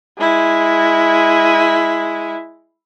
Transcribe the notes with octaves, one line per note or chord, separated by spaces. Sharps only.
G#3 E4